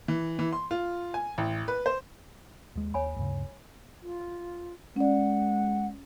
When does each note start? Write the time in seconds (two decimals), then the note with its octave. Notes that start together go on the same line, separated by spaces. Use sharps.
0.08 E3
0.39 E3
0.53 C6
0.71 F4
1.14 G#5
1.38 A1
1.68 B4
1.86 C5
2.75 D#2 G#3
2.94 D#2 C#5 G#5 B5
3.16 D2 G2 C#3
4.02 F4
4.96 G#3 C#4 D5 F#5